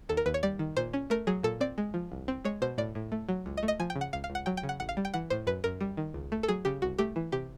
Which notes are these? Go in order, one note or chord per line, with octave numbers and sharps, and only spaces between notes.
D#2 A4
A#4
D#2 B4
C#5
G3 D5
D#3
A#2 C5
C#4
A3 A#4
F#3 G#4
A#2 A4
C4 D5
G#3
F3
C2
C4
G#3 C#5
B2 C5
A2 D5
A2
A3
F#3
C#2
D#5
A3
D#5
F3 G#5
G5
C#3
F#5
C#2 F5
F5
C#2
F#5
F#3 G5
G5
C#3
F#5
A1 F#5
F5
G3
G5
E3 F#5
A2 C5
F#2 B4
F#2 A#4
G3
D#3
C#2
A3
A4
F#3 G#4
C#3 G4
C2 F#4
A3 G4
E3
C3 G4